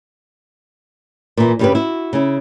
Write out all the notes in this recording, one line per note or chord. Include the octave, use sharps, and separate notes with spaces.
A#2 E3
G2 C#3 G3 D#4 G4 B4
E4 F#4
C#3 E4